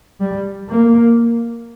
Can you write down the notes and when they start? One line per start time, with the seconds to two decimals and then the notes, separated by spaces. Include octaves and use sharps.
0.20 G3
0.69 A#3